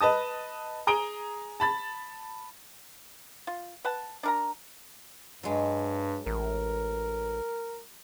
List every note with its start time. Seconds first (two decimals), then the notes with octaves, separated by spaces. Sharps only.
0.01 B4 D#5 A5 D#6
0.87 G#4 A#5 D#6 D7 G7
1.60 A5 B5 A6
3.47 F4
3.85 B4 F#5 A5
4.23 D4 A#4 A#5
5.43 G2 F#3 G#3
6.26 A1 A#4